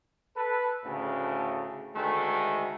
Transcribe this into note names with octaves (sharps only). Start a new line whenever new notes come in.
A4 B4
D2 A2 C#3
D2 D#3 G#3 A3